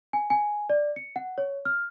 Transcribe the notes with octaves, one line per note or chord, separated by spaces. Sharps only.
G#5
G#5
D5
C#7
F#5
C#5
F6